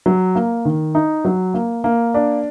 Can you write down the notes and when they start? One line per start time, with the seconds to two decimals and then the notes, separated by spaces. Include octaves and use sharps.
0.06 F#3
0.35 A#3
0.65 D#3
0.95 D#4
1.25 F#3
1.54 A#3
1.84 A#3
2.14 D4